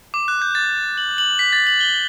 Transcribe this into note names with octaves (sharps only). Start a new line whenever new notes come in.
D6
F#6
G6
A6
F#7
F#7
B6
A6
F#7
G7